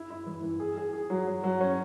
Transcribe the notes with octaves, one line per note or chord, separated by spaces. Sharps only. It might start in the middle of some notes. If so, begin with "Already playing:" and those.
Already playing: E4
E4
E3
E3
G#4
G#4
G#4
F#3
F#3
F#3
C#4